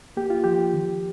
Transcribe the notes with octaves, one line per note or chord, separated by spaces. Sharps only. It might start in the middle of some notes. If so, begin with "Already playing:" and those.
A#3 G4
F4
F3 G4
D#3